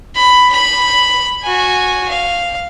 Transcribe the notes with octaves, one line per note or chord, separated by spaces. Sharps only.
B5
B5
F#4 G#5
F5